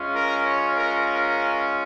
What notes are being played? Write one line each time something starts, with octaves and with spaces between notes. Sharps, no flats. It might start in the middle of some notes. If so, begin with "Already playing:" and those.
Already playing: G#3 C#4 F4
A#4
C#5
A#4
A#4